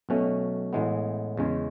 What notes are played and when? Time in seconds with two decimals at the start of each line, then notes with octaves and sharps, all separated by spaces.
0.09 B1 B2 A3 C#4
0.73 A1 A2 E3 G#3 B3
1.37 E2 C#3 G#3 C#4